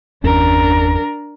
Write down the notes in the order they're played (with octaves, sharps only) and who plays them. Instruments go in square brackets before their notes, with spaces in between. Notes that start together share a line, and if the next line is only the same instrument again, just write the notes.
[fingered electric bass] G1 E2 C#4 [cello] D4 A#4